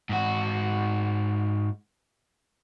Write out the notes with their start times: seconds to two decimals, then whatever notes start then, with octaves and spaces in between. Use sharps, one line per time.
0.09 G#2 F#4